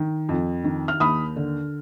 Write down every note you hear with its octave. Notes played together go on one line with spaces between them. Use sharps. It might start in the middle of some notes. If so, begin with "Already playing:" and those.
Already playing: D#3
F2
D#3
F6
D#2 B5 D#6
D3